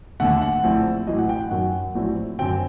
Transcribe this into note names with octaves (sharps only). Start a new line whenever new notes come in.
D#2 D3 A3 F#5
F#5
A#1 A2 A3 C4
A1 A2 F#3 D#5
F#5
G5
F#5
F#2 D#3 F#3 F#5
A#1 A2 F#3 A3 C4
F#2 D3 F#3 C4 G5